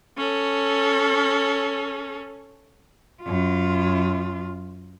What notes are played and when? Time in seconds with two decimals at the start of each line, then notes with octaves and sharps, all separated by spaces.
0.17 C#4 A4
3.23 F#2 F4